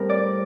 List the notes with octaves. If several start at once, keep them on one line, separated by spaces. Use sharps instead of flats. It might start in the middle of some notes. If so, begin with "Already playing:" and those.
Already playing: A2 G3 C4 A#4
D5